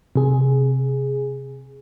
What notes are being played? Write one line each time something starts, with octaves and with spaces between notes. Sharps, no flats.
C3 G#4